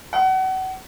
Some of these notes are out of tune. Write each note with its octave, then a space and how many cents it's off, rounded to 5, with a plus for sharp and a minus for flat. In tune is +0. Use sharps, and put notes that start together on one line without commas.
F#5 +30